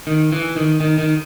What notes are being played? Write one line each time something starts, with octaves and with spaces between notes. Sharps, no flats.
D#3
E3
D#3
D#3
D#3